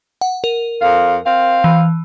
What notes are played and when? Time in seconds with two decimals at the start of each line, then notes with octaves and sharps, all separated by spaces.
0.21 F#5
0.44 A#4
0.82 F2 F5
1.25 C4 F5
1.64 E3